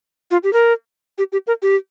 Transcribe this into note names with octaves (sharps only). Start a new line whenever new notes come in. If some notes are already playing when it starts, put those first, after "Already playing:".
F4
G4
A#4
G4
G4
A#4
G4